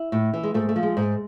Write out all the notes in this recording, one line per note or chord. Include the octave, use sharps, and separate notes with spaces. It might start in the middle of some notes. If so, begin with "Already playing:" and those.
Already playing: E4
A2
E3
G#3
G#2 A3
A3
F3
G#3
G#2